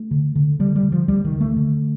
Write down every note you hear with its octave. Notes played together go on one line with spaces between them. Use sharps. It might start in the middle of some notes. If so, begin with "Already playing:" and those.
Already playing: A3
D3
D3
D3 G3
G3
D3
F3
D2 G3
D#3
D3
A3
D3